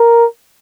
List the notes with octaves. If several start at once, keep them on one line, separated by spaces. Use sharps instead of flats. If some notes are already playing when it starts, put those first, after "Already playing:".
Already playing: A#4